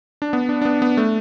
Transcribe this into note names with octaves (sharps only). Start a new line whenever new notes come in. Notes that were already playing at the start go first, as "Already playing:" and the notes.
D4
B3
D4
D4
B3
B3
A3